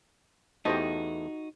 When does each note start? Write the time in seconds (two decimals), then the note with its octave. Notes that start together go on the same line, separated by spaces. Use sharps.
0.65 E2 A3 D#4 F#4 G4 C5 D#5 A5